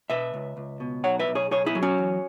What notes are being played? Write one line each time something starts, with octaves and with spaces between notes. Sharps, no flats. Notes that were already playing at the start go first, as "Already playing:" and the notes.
B2 B4 E5
C#2
C#2
B2
B1 C#5 F#5
B4 E5
B1
G#4 C#5
B1 G#4 C#5
E4 G#4
F#3
C#4 F#4
E2